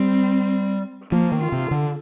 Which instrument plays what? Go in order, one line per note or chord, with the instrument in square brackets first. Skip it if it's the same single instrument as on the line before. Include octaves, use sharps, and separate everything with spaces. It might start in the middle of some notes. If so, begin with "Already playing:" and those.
Already playing: [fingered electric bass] G3 [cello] C4
[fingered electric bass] F3 [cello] A#3
[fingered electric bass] D#3
[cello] F4
[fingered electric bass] C3
D3